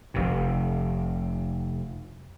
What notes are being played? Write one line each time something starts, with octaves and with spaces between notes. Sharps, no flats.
F1 C3